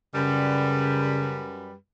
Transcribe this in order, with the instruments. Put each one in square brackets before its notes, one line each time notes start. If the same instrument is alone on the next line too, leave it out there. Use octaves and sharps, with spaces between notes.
[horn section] F#2 G3 B4 [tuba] C#3